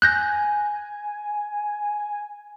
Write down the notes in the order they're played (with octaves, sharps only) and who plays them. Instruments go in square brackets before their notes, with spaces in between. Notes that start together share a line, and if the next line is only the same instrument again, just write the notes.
[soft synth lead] G#5 [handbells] F#6 G6 A#6